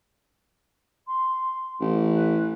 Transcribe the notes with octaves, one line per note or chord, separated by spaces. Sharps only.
C6
A1
B4